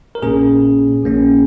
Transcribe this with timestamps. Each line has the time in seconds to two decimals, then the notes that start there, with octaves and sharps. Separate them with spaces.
0.15 A#4
0.22 A#1 A#2 A#3 C#4 G#4
1.04 A#1 A#2 A#3 C#4